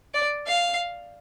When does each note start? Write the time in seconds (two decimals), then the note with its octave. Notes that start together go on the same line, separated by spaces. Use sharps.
0.14 D5
0.47 F5